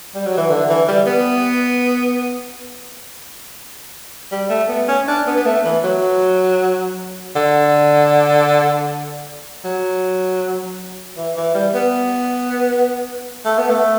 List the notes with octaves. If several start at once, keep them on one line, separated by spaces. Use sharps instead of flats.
G3
F#3
E3
D3
E3
G3
B3
G3
A3
B3
C#4
D4
B3
B3
A3
E3
F#3
D3
F#3
E3
E3
G3
B3
A3
B3
A3